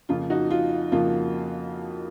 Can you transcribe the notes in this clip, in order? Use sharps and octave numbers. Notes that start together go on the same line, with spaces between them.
F2 C#3 F3 A#3 F4
D#4 F#4
F4
F2 C#3 F3 A#3 F4